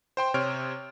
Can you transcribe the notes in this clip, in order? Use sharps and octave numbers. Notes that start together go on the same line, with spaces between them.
C5 G5 C6
C3 C5 C#5 F6 D7